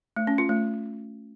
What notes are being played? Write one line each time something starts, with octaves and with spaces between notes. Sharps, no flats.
A3
C#4
F4
A3